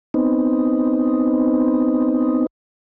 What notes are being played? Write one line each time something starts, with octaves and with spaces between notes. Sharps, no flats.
B3 C4 D#4